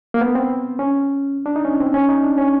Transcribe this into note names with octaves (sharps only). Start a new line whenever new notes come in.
A#3
B3
C4
C#4
D4
D#4
C#4
C4
C#4
D#4
D4
C#4